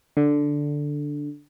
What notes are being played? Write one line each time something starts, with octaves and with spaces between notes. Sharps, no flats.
D3